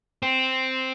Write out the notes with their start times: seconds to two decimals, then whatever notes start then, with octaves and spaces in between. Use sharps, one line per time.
0.23 C4